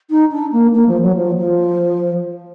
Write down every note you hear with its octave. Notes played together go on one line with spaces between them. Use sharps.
D#4
D4
A#3
A#3
F3
F#3
F3
F3